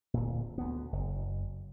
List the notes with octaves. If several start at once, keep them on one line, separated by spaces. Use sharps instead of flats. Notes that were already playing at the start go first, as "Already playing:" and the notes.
D1 A#2
D2 B3
F#1